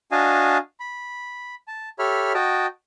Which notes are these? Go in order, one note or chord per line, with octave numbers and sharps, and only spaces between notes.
D4 F#4 D#5 F5 G#5 A5
B5
A5
G4 A4 C#5 E5 B5 F6
F#4 D#5 G5 A5